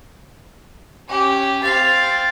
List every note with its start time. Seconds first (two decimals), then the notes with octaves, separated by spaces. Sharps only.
1.08 C#4 G4
1.63 C4 F5 A6